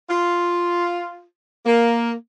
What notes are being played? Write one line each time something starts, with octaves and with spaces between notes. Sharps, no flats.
F4
A#3